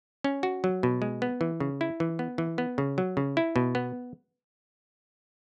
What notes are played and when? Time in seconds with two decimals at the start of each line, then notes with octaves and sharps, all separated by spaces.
0.24 C#4
0.43 F#4
0.64 F#3
0.83 B2
1.02 G#3
1.22 B3
1.41 E3
1.60 C#3
1.81 E4
2.00 E3
2.19 B3
2.38 E3
2.58 B3
2.78 C#3
2.98 F#3
3.17 C#3
3.37 E4
3.56 B2
3.75 B3